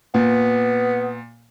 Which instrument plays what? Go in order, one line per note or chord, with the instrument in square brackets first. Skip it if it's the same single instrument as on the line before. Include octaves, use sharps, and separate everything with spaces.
[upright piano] A#2 [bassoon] B3